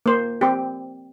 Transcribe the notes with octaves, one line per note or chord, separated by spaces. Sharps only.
A#3 C5
C4 G4